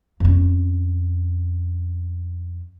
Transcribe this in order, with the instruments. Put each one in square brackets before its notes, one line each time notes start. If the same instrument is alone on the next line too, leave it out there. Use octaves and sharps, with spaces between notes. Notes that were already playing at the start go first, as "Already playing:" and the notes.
[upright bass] F2 C#4